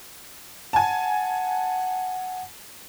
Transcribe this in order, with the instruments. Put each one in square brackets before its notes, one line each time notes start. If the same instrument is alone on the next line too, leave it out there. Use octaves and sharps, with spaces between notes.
[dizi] F#5 [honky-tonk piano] G#5 A5